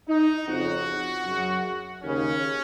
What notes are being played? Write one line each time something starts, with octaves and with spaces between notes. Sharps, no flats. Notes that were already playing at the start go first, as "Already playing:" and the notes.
D#4
F2 C#3 F#4
F#2 C#3
D#2 C#3 C#4